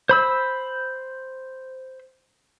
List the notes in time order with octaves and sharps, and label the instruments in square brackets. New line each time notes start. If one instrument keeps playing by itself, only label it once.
[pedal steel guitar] C5 B5 E6